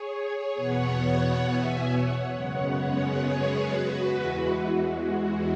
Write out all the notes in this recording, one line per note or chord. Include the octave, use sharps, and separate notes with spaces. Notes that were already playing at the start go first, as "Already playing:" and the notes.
Already playing: G#4 C#5
E2 B2 B3 C#5 F#5
E5 G#5
C#5 F#5
F#2 C#3 G#3 B3 C#5 F#5
C#5 F#5
G#4 C#5
F#4 B4
E2 E3 G#3
F#4
F#4